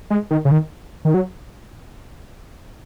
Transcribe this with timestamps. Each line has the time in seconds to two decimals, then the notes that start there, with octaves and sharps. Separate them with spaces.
0.10 G#3
0.31 D#3
0.45 C#3
0.51 D#3
1.05 D#3
1.14 F#3